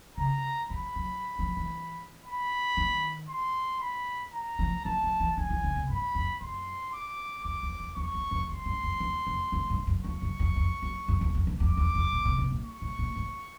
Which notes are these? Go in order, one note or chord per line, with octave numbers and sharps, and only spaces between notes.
C#3 A#5
F3 B5
F#3
F3
E3
B5
D#3
C6
B5
A#5
F3
F3 A5
F3
E3
D#3 G#5
E3
D3
C3
G2 B5
F2
F#2 C6
D6
F2 D6
E2
E2
E2 C#6
E2
F2
F#2 C6
G2
F#2
E2
F2
F#2
G2
F#2
F2 C#6
F#2
F2
F2
F#2
F#2
E2
F2
E2
F2 D6
E2
F2
A#2
B2
B2
A#2
C#6
A2
A#2
G#2